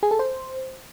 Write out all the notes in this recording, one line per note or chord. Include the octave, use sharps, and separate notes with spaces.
G#4
A4
C5